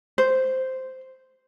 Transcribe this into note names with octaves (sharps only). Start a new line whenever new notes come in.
C5